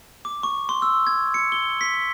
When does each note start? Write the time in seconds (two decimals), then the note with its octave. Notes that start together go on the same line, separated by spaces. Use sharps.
0.25 D6
0.43 C#6
0.69 C6
0.82 E6
1.07 G#6
1.34 C#7
1.52 G7
1.81 B6